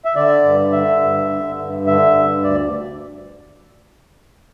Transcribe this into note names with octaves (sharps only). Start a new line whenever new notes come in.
E5
D3 D5
G2
D3 E5
G2
D3
G2
D3 E5
G2
D2 D5